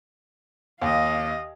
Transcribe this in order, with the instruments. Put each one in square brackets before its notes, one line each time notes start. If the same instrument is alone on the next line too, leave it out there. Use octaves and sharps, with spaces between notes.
[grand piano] D#2 [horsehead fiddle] D#5 F5